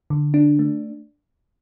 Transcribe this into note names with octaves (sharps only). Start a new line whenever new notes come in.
D3
D4
A3